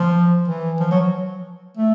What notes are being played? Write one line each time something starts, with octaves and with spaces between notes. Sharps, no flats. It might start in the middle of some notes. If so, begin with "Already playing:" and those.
Already playing: F3
E3
F3
F#3
A3